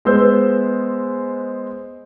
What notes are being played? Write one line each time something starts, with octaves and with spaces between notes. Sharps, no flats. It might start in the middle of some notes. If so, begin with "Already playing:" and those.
G#3 B3 B4 C5 E6 G6